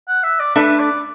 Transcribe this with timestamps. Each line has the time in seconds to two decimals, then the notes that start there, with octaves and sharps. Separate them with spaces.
0.08 F#5
0.23 E5
0.40 D5
0.55 A3 D4 A4 B4 E5
0.79 D5